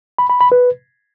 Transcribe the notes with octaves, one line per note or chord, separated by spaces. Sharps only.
B5
B5
B5
B4